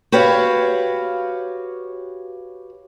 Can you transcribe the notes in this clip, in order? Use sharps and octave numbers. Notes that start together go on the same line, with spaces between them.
F#4 G4 B4 C#5 F5